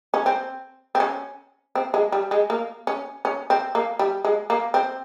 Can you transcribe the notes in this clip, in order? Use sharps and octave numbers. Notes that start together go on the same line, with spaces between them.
C#4
C4
C4
C#4
C4
G#3
G3
G#3
A#3
C#4
C#4
C4
A#3
G3
G#3
A#3
C4